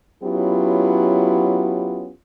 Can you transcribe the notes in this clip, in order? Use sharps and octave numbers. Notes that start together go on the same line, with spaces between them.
F#3 B3 C#4 E4 F4 G4